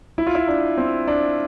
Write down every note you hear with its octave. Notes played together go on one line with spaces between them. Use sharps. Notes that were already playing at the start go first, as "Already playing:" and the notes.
E4
F4
E4
D4
C4
D4